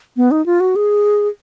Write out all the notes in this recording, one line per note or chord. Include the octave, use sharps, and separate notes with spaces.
B3
D#4
F4
F#4
G#4